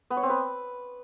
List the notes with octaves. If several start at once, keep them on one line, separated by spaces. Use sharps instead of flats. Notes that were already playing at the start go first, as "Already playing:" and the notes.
B3
C#5
C4
B4